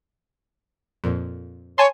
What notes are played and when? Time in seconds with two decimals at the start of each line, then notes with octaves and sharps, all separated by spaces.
1.04 F2 A#2
1.78 C#5 G#5 A5 C6